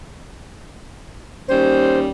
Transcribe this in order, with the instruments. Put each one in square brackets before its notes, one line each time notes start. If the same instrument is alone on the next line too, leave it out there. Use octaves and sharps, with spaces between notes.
[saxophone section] D#2 G3 C#4 [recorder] C5